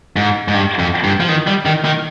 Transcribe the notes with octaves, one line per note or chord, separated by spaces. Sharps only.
G#2
G#2
G2
F2
G2
F3
D#3
G3
D#3
D#3